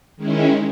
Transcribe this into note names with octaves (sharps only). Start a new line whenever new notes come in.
D#3 G#3 C#4 E4